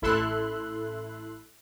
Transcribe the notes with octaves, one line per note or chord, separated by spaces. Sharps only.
A1 E4 A4 E5 C6 F#6